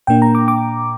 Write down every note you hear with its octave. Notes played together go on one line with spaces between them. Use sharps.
A#2 A#3 D4 G5
A#5
D6
D6